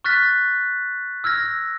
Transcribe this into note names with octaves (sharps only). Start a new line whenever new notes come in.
C#6 F6 F#6 A6 B6
E6 F6 G#6 A#6